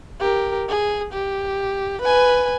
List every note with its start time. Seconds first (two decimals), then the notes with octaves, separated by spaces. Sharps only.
0.20 G4 A#4
0.68 G#4
1.13 G4
2.02 B4 G#5